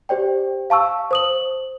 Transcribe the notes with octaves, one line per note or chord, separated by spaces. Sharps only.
G4 C5 D5 G5
F5 A5 C#6 E6
C5 D#6 F#7